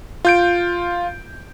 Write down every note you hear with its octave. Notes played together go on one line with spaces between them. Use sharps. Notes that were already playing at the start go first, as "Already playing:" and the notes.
F4 G6 D7